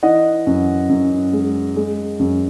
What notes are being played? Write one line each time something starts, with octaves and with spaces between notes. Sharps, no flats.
E3 D#5 F#5
F#2
F#2
G#3
G#3
F#2